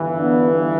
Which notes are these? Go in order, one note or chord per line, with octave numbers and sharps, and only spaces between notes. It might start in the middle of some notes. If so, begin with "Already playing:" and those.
Already playing: G1 G2 E3
B3 D4